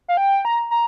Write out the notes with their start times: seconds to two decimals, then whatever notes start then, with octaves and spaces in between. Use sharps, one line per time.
0.08 F5
0.17 G5
0.45 A#5
0.71 A#5